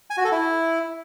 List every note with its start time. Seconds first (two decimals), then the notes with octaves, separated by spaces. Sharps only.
0.10 G#5
0.17 F#4
0.25 A4
0.32 E4